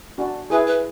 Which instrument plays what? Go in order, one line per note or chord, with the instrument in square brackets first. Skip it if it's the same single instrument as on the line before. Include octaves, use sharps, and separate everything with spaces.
[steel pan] D4 F#4
[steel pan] E4 G#4 [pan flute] B4
[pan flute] B4